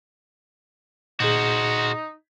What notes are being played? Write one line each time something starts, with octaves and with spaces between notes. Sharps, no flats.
A#2 D#4 F#4 G#4 C5